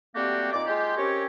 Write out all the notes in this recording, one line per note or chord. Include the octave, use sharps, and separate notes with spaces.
G3 A3 A#3 C4 F#4 G4
A#2 D#4 D5 D6
G#3 F4 G4
C4 C#4 G4 A#4 C#5